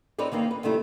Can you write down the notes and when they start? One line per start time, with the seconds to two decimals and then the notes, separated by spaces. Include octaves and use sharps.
0.19 C4 D#4 B4 C#5 D5
0.32 D#3 A#3 C4 D#4
0.51 B4
0.63 C3 D#3 G3 A3 E4